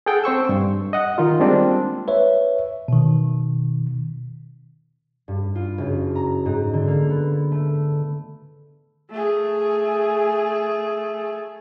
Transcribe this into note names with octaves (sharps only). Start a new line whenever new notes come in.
G#4 A4 F#5 G5
C4 C5 C#6 E6
G2
D#5 F#5
D#3 D#4 F4
G3 G#3 A#3 C4 D4 F4
B4 C#5 E5
B2 D#3
G2
F4
F#1
A#5
G#2
D3
A#3
B3
A3
A3 G#4